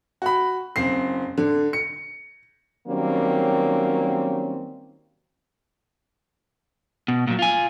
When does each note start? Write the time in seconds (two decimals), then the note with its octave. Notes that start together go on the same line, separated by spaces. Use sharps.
0.22 F#4 B5
0.76 F#1 C4 C7
1.38 D3
1.73 C#7
2.88 D#3 F#3 G3 A#3 C4 C#4
7.08 B2
7.27 A#2 F#3
7.39 F4 G#5